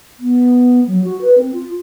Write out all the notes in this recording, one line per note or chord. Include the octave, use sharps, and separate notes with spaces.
B3
F#3
F#4
B4
C4
F4